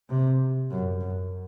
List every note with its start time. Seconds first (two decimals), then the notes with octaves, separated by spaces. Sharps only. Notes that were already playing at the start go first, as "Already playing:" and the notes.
0.10 C3
0.71 F#2
1.00 F#2